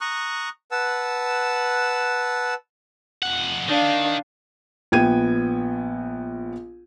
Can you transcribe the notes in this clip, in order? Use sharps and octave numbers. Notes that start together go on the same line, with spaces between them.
A#5 C#6 D#6 F#6
B4 F#5 A5 E6
F2 F#5
D#3 D4 F5
A#1 B3 G5 G#6 D#7